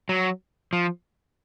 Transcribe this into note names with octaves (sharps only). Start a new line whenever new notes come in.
F#3
F3